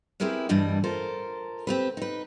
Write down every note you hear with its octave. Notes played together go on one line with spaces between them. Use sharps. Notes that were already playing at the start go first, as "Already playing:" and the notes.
C4 E4 G4 G#4 A#4 B4
G2 E3 G3 D4 D#5
F4 A4 A#4 C5
C4 G4 B4
D#4 B4